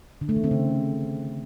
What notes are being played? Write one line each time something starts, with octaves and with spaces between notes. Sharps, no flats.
D3
A3
D#3
C4
C#3